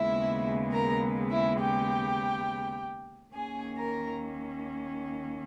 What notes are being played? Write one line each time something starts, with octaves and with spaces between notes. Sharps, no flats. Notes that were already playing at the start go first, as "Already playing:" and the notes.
Already playing: D#2 C#3 G#3 B3 E4 E5
A#4 A#5
E4 E5
G4 G5
D#2 D#3 A#3 C#4 G#4 G#5
A#4 A#5